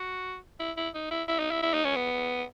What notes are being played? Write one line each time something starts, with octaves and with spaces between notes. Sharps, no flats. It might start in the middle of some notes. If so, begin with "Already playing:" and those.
Already playing: F#4
E4
E4
D#4
E4
E4
D#4
E4
E4
D#4
C#4
B3